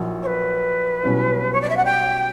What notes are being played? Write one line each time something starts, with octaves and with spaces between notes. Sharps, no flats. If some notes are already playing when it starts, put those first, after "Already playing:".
Already playing: A#1 A#2 F#3 E4
C#5
B4
B1 B2 G3 C#4 E4
C#5
D5
E5
F#5
G5